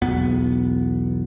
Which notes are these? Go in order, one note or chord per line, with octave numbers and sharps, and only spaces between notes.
B1 E2 B3